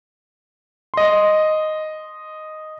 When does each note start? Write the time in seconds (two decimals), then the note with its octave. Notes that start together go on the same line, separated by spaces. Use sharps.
0.94 D#5 C6